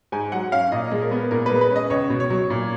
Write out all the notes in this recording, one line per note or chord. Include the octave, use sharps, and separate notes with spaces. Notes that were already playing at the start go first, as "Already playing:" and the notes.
G#2 G#5
F#3 F#5
C#4 F5
A#2 D#5
G#3
A#4
B3
A#2 A#4
B4
G#3
B4
C#4
D#5
C#2 C#5
B2
C#5
F#3
A#2